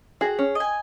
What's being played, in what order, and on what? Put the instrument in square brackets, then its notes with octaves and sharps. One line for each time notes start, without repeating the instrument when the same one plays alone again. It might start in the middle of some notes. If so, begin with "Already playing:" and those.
[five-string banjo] F#4 [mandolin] G#4
[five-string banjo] C#4
[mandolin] D#5 G#5